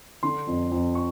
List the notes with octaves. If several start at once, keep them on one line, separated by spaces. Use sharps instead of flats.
D3 C6
F2
F2
C#6